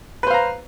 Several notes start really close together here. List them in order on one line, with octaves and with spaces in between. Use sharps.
B4 C5 F5 A#5